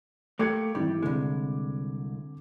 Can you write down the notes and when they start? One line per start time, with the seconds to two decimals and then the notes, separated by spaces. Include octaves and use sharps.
0.39 A3 A#3 G4 D6 G#6 C#7
0.75 G#1 E3 G3 D6
1.02 C2 D3 G#3 C4